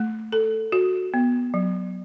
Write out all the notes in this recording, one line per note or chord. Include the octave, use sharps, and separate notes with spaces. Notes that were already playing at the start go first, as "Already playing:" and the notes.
Already playing: A3
A4
F#4
B3
F#3